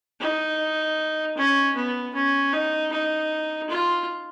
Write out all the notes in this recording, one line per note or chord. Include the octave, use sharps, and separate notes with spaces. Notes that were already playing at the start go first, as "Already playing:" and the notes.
D#4
C#4
B3
C#4
D#4
D#4
F4